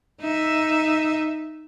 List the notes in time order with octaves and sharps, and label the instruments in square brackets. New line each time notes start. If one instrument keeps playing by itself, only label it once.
[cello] D#4 E5